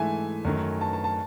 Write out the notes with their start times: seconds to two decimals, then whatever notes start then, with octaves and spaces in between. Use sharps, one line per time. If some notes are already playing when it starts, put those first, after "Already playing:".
Already playing: G#2 E3 A3 E5 G#5
0.45 F#2 D#3 A3
0.81 A5
0.93 A5
1.04 A5